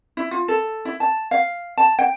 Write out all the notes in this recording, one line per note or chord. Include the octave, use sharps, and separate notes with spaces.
E4
F4
A4
E4
A5
F5
A5
G5